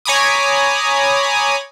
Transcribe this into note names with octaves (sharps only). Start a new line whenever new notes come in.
C#5 G#5 A#5 B5 D6 D#6